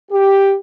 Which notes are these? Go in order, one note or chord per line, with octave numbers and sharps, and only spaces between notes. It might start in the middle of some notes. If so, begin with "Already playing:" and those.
G4